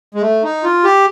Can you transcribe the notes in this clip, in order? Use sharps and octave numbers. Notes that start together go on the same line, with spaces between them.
G#3
A3
D#4
F4
G4